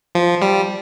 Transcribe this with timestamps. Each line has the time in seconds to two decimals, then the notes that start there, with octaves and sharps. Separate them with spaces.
0.15 F3
0.42 G3